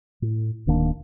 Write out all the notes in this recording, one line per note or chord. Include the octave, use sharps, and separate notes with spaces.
A2
D1 D#3 A#3 D4